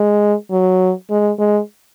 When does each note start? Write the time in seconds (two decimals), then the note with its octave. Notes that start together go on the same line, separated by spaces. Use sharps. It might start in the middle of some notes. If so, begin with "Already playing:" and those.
Already playing: G#3
0.51 F#3
1.10 G#3
1.39 G#3